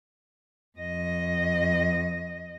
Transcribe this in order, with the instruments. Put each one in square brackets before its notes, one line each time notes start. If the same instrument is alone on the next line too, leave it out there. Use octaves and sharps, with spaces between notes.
[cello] F2 D#5